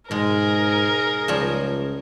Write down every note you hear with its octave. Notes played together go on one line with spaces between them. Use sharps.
G#2 B2 G#3 D#4 G#4 A#4
C#2 F3 G3 C#5